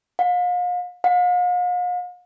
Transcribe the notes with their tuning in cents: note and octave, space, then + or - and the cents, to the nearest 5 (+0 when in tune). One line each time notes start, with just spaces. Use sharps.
F5 +40
F5 +45